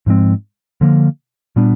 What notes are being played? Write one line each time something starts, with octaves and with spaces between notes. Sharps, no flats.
G#2 F3 G#3 C4
D3 F3 A#3
A#2 G3 B3 D4